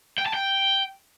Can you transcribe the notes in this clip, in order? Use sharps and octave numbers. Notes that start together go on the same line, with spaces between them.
G5
A5
G5